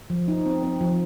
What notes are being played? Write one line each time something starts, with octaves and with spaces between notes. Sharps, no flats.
F3
D#4
C4
C4
F3